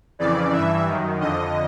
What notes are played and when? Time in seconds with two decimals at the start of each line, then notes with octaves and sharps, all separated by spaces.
0.19 F2 C#3 E3 D5
0.53 G2 E3 E5
0.87 F#2 D#3
1.20 F2 D3 D#5